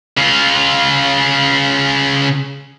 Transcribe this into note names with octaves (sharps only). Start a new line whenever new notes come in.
C#3 F4